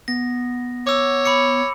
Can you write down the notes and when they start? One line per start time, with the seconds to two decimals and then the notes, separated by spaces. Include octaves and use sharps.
0.08 B3 A#6
0.87 C#5 D6 E6
1.25 B5 D6 C#7